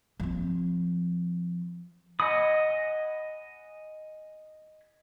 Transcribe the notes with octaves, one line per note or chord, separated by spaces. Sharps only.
F3 C4
D#5 F#5 G#5 B5 D#6